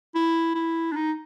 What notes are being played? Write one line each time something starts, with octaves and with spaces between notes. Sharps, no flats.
E4
E4
D4
D#4